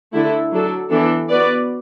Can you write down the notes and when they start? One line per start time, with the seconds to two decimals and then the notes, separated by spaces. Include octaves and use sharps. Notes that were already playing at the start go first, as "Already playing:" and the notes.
0.14 D3 A3 E4 A4
0.52 F#3 D4 A4
0.91 E3 B3 D4 A4
1.29 B3 F#4 B4 D5